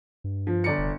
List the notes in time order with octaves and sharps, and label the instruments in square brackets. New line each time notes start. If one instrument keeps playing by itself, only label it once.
[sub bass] G2
[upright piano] F3
G1 D5 C#7
[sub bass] F1